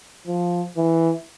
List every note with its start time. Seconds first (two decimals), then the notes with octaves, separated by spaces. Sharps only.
0.27 F3
0.77 E3